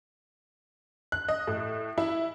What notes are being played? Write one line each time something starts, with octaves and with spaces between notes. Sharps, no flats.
F#6
D#5
A2
E4